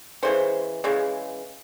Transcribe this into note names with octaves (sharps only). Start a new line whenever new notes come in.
C#3 E3 G#3 C5
C#3 E3 G#3